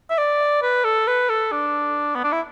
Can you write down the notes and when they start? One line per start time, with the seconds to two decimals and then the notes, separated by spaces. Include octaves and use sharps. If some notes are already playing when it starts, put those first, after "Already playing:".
0.10 E5
0.18 D5
0.63 B4
0.84 A4
1.08 B4
1.29 A4
1.52 D4
2.15 B3
2.24 D4
2.33 E4